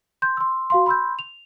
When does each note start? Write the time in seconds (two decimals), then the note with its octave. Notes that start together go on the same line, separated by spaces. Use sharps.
0.22 C6 G6
0.37 C6 E6
0.70 F#4 F5 C6
0.86 B5 C6 E6 G6
1.19 F7